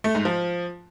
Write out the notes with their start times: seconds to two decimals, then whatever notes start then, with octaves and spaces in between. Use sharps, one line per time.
0.04 A3
0.15 G#2
0.25 F3